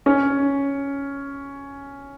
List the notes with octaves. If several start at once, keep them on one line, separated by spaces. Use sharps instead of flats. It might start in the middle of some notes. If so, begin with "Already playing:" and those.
C#4